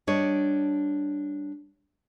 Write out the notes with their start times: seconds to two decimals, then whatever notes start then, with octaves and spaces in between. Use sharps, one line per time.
0.07 G3 D4 C#5 D#5